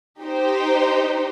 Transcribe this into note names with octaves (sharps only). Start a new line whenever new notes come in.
D#4 G4 C5